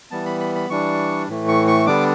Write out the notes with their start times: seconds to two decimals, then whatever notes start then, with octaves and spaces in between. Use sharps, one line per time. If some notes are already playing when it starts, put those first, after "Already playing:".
0.11 E3 G3 B3 A5
0.26 B5
0.40 B5
0.55 B5
0.70 E3 G3 D4 C#6
1.29 A2 E3 A3
1.48 C#6
1.67 C#6
1.86 D3 G3 B3 D4 D6